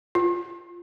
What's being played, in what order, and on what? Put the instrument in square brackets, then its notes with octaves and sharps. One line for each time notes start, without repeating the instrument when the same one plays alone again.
[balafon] F4